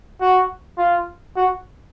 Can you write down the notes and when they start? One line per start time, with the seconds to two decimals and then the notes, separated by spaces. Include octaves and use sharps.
0.21 F#4
0.78 F4
1.36 F#4